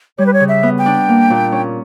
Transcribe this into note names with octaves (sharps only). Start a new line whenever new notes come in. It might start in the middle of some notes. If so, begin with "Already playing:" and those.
G3 C#5
B4
C#5
C#3
E5
B3
G5
D4
A#3
A#2
C#4